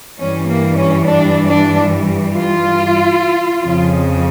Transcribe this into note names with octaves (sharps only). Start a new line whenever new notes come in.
G2 E3 G3 C#4
A#3
C#4
D4
D4
F4
F2 C#3 F3